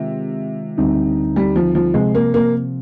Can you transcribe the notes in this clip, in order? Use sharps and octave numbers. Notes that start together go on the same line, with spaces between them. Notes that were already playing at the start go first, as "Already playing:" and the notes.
Already playing: C3 D#3 G#3 C4 F4
D2 D3 G3 C4 D#4
G3
F3
F3
C3 F3 G#3 C4
A#3
A#3